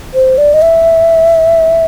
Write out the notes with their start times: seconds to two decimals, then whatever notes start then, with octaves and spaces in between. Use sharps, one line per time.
0.14 C5
0.38 D5
0.54 D#5
0.62 E5